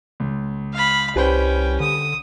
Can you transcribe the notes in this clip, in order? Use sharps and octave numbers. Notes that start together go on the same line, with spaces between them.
C#2
F5 B5
C2 G3 C#4 B4 C5 G5
D3 D#6